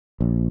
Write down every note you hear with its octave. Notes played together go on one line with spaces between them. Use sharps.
A#1